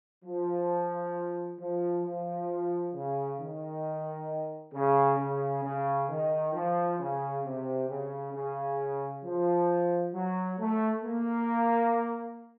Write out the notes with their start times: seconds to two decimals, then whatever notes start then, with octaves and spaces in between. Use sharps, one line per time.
0.25 F3
1.59 F3
2.05 F3
2.94 C#3
3.39 D#3
4.73 C#3
5.19 C#3
5.63 C#3
6.09 D#3
6.54 F3
6.99 C#3
7.44 C3
7.89 C#3
8.33 C#3
9.23 F3
10.13 F#3
10.59 A3
11.03 A#3